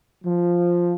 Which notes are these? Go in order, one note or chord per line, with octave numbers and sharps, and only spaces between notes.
F3